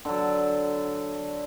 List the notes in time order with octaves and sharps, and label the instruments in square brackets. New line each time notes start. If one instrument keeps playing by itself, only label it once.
[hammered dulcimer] D3 F#3